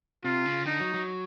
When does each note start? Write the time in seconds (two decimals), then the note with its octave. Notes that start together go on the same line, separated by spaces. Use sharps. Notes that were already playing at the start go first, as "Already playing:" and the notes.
0.24 C3 F4
0.46 C#3
0.65 D3 D#4
0.80 F#3
0.94 F#3